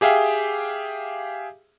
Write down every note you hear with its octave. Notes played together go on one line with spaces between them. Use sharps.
G4 G#4 E5 F5 G5